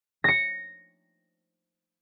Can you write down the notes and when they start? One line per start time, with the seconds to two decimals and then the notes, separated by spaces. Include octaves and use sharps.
0.24 A#6 C#7